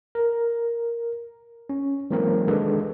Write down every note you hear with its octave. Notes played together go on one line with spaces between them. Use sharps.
A#4
C#4
E3 F#3 G#3 A#3 C4 A#4
D#3 G#3 D4 G4 A4 B4